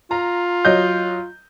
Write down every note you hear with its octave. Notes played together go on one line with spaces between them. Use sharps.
F4 A#5
F#3 D#5 G6